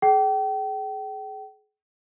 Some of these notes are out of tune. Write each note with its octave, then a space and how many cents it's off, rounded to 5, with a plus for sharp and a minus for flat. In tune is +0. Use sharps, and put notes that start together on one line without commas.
G#4 +30 G5 -35